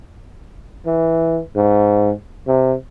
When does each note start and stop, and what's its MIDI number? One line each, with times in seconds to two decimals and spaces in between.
0.86 1.40 52
1.56 2.12 44
2.47 2.74 48